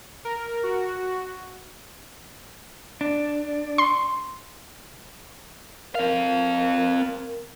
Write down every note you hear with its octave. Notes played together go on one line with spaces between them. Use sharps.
A#4
F#4
D4
C6
C4 A#4 F5